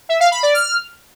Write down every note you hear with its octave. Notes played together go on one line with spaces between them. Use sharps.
E5
F5
B5
D5
F6